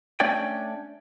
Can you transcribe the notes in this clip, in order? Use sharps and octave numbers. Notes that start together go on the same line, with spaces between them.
A3 C#4 D4 C#5 D5 G5